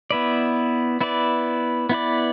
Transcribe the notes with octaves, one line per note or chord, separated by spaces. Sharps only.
B3 E4 B4 D5
B3 E4 B4 D5
B3 E4 B4 D5